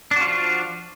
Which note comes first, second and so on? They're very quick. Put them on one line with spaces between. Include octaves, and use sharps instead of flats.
D4 F#4 F4 F3